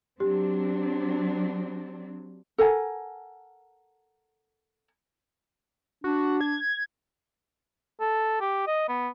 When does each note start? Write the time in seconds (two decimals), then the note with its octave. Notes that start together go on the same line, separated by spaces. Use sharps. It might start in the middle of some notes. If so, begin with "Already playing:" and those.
0.20 F#3 C4 D4 G4
2.58 A4 A#4 F#5 G#5
6.04 D4 F#4
6.41 G#6
8.00 A4
8.41 G4
8.67 D#5
8.88 B3